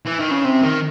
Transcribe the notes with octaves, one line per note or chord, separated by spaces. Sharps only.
E3
D#3
C#3
C3
D#3